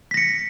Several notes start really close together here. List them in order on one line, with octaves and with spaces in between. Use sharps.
B6 A#6 C#7